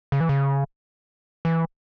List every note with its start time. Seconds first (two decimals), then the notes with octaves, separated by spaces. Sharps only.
0.12 C#3
0.21 E3
0.29 C#3
1.45 E3